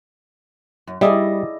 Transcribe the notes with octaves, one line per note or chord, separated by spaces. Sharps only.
F#2
G3 E4 G#4 D5 D#5